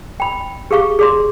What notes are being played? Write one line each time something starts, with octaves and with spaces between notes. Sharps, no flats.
G5 B5
G4 G#4 F5 C#6
G#4 D5 C6